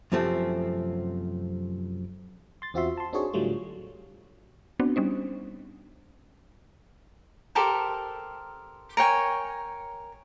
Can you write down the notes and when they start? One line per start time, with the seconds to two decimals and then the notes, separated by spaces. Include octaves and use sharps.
0.12 F#2 C3 F3 A3 C4
2.62 C6 A6
2.74 E2 C4 F4 F#4 E5 C6
2.97 A5 C6
3.13 C4 D4 D#4 F#4 G#4 C#5
3.33 A2 D3 F#3 G3 A3 F4
4.80 B3 C4 D4 F#4
4.96 G3 C#4 D#4 C5
7.55 G4 A4 A#4 C5
8.97 A#4 C#5 G5 G#5